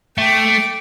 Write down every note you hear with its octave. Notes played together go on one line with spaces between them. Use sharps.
A3 G5 D6